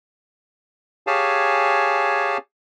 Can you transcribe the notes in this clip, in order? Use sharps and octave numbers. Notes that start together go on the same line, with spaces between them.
G4 G#4 C#5 F5 G#5 A5